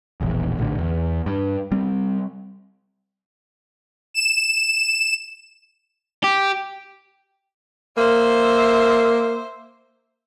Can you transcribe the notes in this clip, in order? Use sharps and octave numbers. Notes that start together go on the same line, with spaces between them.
E1 A#1 E2
A#1 A2 D3
E2
G2
G3 C4
E7
G4
A#3 C5 E5